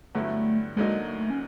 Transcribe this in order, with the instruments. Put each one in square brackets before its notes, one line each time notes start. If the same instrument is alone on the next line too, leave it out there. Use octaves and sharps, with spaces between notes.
[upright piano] G2 D3 F#3 B3 E4 [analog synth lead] A3
[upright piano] D2 D3 F#3 A#3 D#4 [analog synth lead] G#3
[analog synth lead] A3
C#4